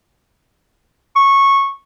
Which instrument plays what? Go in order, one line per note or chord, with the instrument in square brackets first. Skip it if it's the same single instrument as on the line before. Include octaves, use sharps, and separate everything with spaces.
[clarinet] C#6